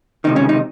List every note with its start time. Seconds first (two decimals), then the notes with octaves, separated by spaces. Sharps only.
0.24 C#2 C3 D#3 D#4
0.36 C#4
0.49 D#4